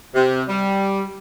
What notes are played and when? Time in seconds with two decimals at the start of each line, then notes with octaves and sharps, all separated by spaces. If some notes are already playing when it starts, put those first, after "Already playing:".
0.14 C3
0.48 G3